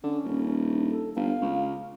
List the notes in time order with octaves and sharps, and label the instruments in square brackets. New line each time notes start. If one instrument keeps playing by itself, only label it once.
[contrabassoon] D3 [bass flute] C#4
[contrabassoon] D#1
[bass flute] D4
A4
[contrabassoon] G1 [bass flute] F5
[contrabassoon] C#2